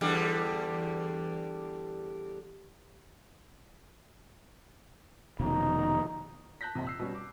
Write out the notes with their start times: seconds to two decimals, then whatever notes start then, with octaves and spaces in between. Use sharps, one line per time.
0.01 E2 D3 G3
5.40 F1 B2 D#3 D#4 A#5
6.61 A5 F#6 G6 A#6 B6
6.75 A#1 F2 C3
6.86 E6 C7
6.99 B2 G3 C#4
7.15 D6